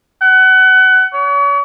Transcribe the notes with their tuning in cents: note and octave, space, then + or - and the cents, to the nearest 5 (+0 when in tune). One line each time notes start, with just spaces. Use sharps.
F#5 +25
C#5 +40